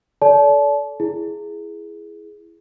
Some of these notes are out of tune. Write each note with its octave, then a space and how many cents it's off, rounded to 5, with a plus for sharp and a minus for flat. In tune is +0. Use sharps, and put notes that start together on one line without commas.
A4 -10 D5 -35 A5 -30
E4 +15 G#4 +5